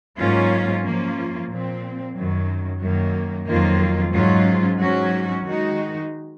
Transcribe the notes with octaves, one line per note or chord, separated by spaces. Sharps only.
G#2 F#3 A#3 C#4 F4
F#2 F3 A#3 C#4 F4
A#2 F3 C4
F#2 D#3 F#3
F#2 D#3 F#3 A#3
F2 D#3 F#3 A#3 F4
G#2 F#3 C#4 F4
G#2 F#3 C#4 F#4
D#3 G#3 D#4 F#4